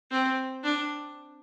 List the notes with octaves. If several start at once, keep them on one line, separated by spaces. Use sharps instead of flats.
C4
D4